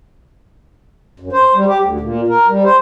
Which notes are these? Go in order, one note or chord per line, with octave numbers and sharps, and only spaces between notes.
F#2
C5
G3
G4
D2
A#2
A#4
G3
C5